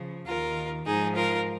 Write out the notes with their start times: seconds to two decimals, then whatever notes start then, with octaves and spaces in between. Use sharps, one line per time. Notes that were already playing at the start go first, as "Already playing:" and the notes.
Already playing: C#3 F3
0.26 D#2 D#3 F4 A#4
0.85 G#2 F3 D#4 G#4
1.15 F4 A#4